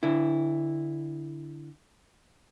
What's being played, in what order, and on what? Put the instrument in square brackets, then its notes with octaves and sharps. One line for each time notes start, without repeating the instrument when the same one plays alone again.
[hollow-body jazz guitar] D3 E4